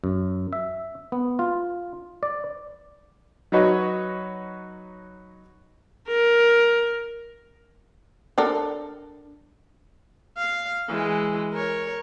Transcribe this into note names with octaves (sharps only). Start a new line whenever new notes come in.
F#2
E5
B3
F4
D5
F#3 D#4 F#4 B4 C#5 D#5
A#4
D4 A4 A#4
F5
E3 G#3
A#4 C#5